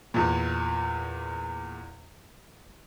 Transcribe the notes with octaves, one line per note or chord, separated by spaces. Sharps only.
E2 A#2